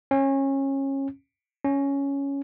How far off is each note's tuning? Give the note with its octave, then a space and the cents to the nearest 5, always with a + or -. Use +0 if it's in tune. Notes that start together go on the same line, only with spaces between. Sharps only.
C#4 -25
C#4 +5